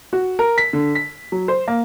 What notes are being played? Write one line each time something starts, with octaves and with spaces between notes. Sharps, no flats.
F#4
A#4
B6
D3
B6
F#3
C5
A#3